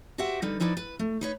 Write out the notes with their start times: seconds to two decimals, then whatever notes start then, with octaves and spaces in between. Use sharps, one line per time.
0.18 F#4 G4 C5 E5 F#5
0.42 D3 G3 D#4 B4
0.60 F3 D#4 E4 B4 D5
0.77 B4
0.99 A3
1.21 D#4 B4 C#5